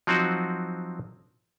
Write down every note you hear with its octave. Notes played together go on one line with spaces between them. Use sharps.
F3 F#3 C4 D#4 F#4